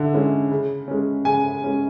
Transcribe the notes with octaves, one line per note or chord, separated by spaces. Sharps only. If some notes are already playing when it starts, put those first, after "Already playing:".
Already playing: D3 E4
G#3 C#4 E4
C#3
G#3 C#4
C#3 G#5
G#3 C#4